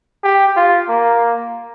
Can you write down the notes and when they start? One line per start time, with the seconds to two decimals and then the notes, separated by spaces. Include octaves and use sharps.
0.23 G4
0.56 F4
0.88 A#3